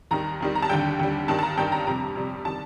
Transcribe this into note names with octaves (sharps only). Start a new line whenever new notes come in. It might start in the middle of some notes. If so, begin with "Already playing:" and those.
D#2 D#3 G3 A#5
D#2 D#3 G3
A#5
A5
D#2 D3 G3 G5
D#2 D3 G3
G2 D#3 G3 A5
A5
A#5
G2 D#3 G3 G5
A#5
F2 C3 G3 A#5
F2 C3 G3
D#3 G3 A5